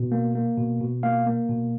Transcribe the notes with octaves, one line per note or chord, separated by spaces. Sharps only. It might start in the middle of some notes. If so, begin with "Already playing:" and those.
Already playing: B2
A#3
A#3
B2
B2
A#3 F5
A#3
B2